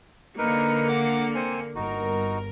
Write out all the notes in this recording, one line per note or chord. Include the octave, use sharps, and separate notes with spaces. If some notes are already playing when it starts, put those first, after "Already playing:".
D3 A#3 D#4 A#4 B4 C#7
F#5 D6
C4 C5 G#5
G1 D#4 F#4 A#4